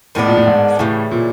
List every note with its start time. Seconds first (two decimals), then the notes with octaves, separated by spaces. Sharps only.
0.15 A2 D#3 G#3 B3 D4
0.27 A#2
0.37 A2
0.47 G#2
0.79 A2 C#3 E3 G3
1.11 A#2